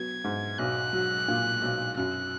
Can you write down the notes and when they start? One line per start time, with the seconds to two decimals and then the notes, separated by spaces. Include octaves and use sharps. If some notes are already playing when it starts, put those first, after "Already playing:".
Already playing: F#3 B3 G#6
0.24 G#2
0.59 B1 F#6
0.93 F#3
1.28 A#2
1.62 B1
1.97 F#2 F#6